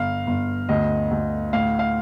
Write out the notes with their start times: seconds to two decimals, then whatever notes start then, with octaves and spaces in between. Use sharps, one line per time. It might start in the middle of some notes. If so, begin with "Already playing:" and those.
Already playing: G1 F5
0.27 G1
0.69 D2 D#5
1.11 D2
1.53 A2 F5
1.79 F5